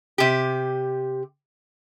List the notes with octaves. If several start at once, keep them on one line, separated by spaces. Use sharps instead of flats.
C3 G4